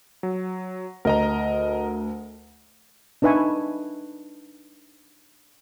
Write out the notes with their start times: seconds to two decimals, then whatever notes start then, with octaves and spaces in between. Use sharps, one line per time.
0.23 F#3
1.05 D2 A#4 D#5 A#5
3.22 D4 D#4 B4 E5 G#5 C#6